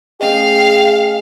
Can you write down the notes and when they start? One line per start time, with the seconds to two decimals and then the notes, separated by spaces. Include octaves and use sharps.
0.21 A3 C#4 G#4 D#5 F5 G5